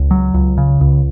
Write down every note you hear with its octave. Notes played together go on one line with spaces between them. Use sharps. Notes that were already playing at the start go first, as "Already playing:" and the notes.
Already playing: C#2
F#3
C#2
C#3
C#2